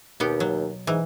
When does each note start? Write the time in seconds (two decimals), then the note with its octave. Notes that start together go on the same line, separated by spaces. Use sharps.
0.20 D#2 B2 B3 G4
0.40 F#3
0.87 G#2 E3